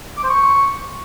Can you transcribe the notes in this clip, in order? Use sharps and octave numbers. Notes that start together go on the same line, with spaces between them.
D6
C5
C#6